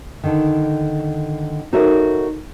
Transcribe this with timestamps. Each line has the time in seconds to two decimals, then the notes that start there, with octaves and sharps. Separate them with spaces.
0.24 D3 D#3
1.73 D#4 F#4 A4 A#4 C#5 E5